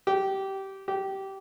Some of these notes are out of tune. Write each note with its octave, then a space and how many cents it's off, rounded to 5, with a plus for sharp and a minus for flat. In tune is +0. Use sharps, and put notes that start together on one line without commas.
G4 -20
G4 -20